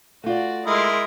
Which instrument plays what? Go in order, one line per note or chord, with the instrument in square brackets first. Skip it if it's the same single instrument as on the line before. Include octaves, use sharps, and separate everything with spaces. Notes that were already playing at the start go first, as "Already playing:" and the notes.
[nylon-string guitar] A3 F4 [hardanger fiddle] F#4 D5
[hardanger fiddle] G#3 C6 [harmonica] E4 A#4 D#6